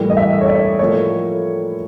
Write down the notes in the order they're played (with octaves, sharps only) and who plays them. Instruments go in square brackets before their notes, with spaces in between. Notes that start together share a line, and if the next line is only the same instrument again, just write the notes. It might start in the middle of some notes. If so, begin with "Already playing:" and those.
Already playing: [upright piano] A2 E3 G3 A#3
D#5
E5
C#5
D5
A2 F3 A#3 C#5